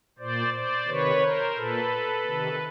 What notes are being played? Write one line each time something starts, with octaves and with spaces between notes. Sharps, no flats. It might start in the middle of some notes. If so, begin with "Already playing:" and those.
A#2 C5 D5
C5 D5
C3 D#3 B4 C#5
A#4 C5
A#2 A4 B4
C3 D#3